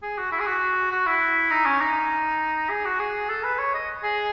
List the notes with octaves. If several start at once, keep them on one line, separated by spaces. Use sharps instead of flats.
G#4
F#4
E4
G#4
F#4
F#4
E4
D#4
C#4
D#4
G#4
F#4
G#4
A4
B4
C#5
D#5
G#4